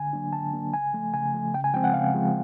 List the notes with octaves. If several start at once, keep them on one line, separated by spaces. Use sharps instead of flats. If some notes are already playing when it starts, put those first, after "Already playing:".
Already playing: D3 G#5
F#3 A#3 D4
D3 A5
F#3 A#3 D4
C#3 G#5
F3 A3
C#3 G#5
F3 A3
C#3 G5
G#5
F3 G#3 C4 G5
F#5
C#3 F5
F3 G#3 C4